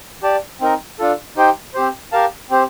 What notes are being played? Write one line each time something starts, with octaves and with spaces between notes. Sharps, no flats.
G4 D5 A5
C4 D#4 A#4
D4 F4 A4
D#4 G4 C5 G5
C4 G4 C5
G4 A#4 F5 A5
C4 G4 C5